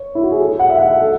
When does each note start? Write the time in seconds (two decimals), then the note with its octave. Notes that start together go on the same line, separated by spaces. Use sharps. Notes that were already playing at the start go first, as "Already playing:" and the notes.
Already playing: C#5
0.15 E4
0.23 F#4
0.32 G#4
0.40 A4
0.59 F#5
0.69 E5
0.78 F#5
1.00 A4